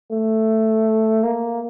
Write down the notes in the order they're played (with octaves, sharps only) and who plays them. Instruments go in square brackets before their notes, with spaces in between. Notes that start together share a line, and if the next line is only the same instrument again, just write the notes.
[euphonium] A3
A#3